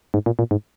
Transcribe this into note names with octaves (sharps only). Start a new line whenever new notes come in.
G#2
A#2
A#2
G#2